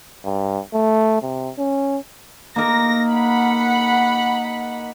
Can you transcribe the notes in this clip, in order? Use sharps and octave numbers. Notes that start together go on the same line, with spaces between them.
G2
A3
C3
C#4
A#3 D#4 A#4 A#6
F#5 B5